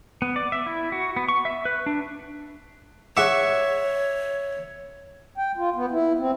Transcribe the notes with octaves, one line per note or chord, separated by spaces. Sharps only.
B3
D5
E5
E4
F#4
B3
C#6
E5
B4
D4
G#4 C#5 E5 F#5 C#6 D6
G5
F4
B3
E4
C4